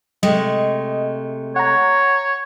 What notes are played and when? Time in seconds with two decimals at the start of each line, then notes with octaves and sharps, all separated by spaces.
0.23 C3 G#3 A3 D#5
1.56 C#5 F#5 A#5